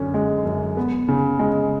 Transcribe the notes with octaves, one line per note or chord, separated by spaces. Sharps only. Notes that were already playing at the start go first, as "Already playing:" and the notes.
Already playing: F#2 D3 C#4
G#3
F#2
B3
C#3
G#3